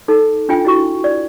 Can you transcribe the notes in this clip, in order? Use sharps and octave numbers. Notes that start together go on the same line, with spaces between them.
D#4 A4
D4 F4 G5 G#5
E4 F#4 C#6
D5